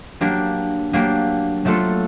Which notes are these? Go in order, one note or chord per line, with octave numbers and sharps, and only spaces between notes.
F#3 A#3 D4 G4
F#3 A#3 D4 G4
F#3 A3 D4 F4 A4